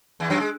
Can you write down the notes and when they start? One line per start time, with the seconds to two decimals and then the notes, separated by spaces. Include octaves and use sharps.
0.20 E2 E3
0.30 F#2 F#3
0.40 G#3